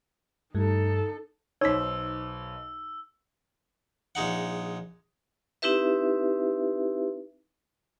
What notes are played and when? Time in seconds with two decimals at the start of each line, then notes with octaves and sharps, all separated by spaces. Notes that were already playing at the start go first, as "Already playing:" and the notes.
0.55 G2 A3 D#4 A4
1.61 B1 D#4 C5 C#5 D6 E6 B6
4.15 A#1 G#3 D#4 F#5
5.62 C4 D#4 E4 G4 B4 E5